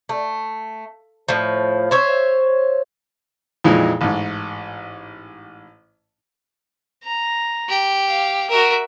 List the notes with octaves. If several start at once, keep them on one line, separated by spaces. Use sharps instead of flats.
A3
A2 F3
C5 C#5 E5
F2 A#2 E3 F3 G#3 D#4
A1 G#2
A#5
G4
F5
F#4 A#4 E5